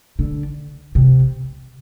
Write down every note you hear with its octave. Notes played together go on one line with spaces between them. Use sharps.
D3
C3